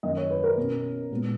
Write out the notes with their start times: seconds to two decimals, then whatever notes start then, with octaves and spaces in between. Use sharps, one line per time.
0.03 F#2 D#3 A#3 D#5
0.17 C#5
0.30 B4
0.44 A#4
0.58 B2 A#3 C#4
1.11 A#2 G#3 B3